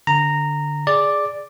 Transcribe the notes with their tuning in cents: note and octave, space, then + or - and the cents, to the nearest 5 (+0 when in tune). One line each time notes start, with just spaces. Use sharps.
D3 +0 A#5 -10
G#4 +0 D5 +0